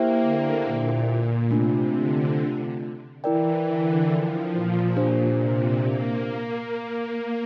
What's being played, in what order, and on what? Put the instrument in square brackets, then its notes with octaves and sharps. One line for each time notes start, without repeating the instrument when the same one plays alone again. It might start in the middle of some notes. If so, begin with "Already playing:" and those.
Already playing: [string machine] A#3 [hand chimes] E4 G4 C5 E5 G5
[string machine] D3
A#2
A#2
[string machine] C3 [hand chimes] A3 D4 F4
[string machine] D3
[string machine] E3 [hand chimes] E4 A#4 D5 G5
[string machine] D3
F3
A#2
[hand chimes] D4 G4 C5
[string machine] C3
A#3